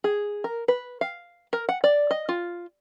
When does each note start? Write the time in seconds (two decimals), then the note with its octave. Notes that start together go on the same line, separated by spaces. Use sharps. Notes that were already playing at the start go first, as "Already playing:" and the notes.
0.04 G#4
0.44 A#4
0.68 B4
1.01 F5
1.53 A#4
1.69 F#5
1.84 D5
2.11 D#5
2.29 F4